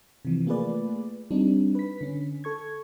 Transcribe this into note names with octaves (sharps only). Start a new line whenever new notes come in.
C3 E3 F3
A3 A#3 F4 G#4 B4 D5
G3 C4 D4 D#4
B4 B6
D3 C#4
A4 C#6 G#6